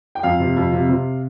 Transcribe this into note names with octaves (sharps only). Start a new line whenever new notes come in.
G5
F2 F5
C3
F2
C3
C3